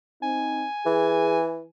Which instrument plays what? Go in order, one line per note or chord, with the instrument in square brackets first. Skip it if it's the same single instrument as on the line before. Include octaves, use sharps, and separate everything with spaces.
[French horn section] C4 D#4 [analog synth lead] G#5
[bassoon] E3 [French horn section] G#4